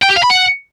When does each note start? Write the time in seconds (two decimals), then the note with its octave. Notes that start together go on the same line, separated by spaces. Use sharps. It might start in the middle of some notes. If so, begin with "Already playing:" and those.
0.03 G5
0.10 G4
0.17 F5
0.24 B5
0.30 F#5